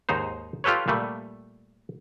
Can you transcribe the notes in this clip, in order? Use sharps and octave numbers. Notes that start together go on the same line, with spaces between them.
D#2 G#2 D#4 C5
F4 G4 A4 B4 C#5
A#2 G3 A3